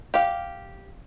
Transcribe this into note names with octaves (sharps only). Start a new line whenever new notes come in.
G4 F5